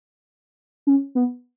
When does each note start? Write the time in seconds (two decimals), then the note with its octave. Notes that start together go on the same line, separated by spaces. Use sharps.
0.87 C#4
1.15 B3